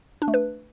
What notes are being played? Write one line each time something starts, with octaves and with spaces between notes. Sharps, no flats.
D4
A3
B4